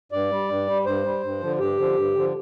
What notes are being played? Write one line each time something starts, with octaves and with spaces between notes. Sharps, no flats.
G2 D5
G3
G2
G3
G2 C5
G3
G2
D3 F3
G2 G4
D3 F3
G2
D3 F3